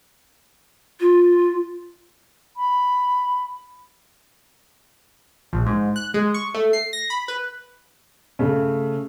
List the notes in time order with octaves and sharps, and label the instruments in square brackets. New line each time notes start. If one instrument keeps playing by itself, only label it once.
[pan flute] F4
[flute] B5
[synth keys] A#1
G#2
F#6
G#3
C#6
A3
C7
A#6
B5
B4
[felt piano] C#3 A3